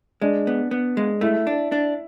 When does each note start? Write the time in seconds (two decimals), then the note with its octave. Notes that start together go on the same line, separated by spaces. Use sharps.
0.21 G#3 D4 D5
0.47 B3
0.71 B3
0.97 G#3
1.21 A3 E4 E5
1.47 D4
1.72 D4